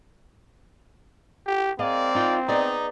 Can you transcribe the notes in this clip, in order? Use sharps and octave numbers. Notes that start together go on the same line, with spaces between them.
G4
A#3 C4 G#4 D5 D#5 F5
D#4 F4 G5
B3 D#4 G#4 D5